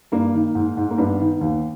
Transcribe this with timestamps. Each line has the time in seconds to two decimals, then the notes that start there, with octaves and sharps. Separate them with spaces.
0.12 G2 A#3
0.34 D#3
0.55 G#2
0.77 G#2
0.90 A#3
0.98 G2 B3
1.21 D#3
1.41 D#2